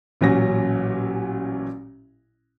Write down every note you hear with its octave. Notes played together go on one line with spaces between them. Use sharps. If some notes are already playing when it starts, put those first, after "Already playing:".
A1 A#2 F#3 C#4 A#6